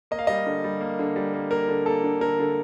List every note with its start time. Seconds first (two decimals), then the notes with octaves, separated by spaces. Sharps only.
0.11 A#3 D#5
0.19 F5
0.27 G3 D#5
0.46 D3
0.64 G3
0.81 A#3
0.99 D3
1.16 G3
1.34 A#3
1.51 A#3 A#4
1.69 D3
1.86 A#3 A4
2.04 D3
2.21 D3 A#4
2.39 D3